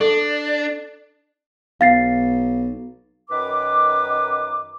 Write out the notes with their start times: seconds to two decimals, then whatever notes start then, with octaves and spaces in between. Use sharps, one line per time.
0.01 D4 A4
1.81 B1 F5 A6 C7
3.30 F#2 D#3 B4 D6